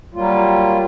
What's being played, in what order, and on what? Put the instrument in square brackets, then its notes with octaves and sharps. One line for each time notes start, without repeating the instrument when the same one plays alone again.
[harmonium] F#3 G3 A#3 F4